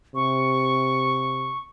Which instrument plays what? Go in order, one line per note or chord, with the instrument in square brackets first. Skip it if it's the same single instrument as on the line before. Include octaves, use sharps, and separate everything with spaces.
[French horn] C3 [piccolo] C#6